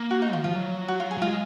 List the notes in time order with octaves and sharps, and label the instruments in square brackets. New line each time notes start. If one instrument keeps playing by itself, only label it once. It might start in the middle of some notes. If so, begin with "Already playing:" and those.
Already playing: [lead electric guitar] A#3
[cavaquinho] F#4
D#4
[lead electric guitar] D#3 [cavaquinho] F4
[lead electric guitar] F3 [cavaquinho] F4
[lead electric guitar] F#3
[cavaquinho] F#4
F4
G#4
[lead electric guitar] F#3
[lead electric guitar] G#3 [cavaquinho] F4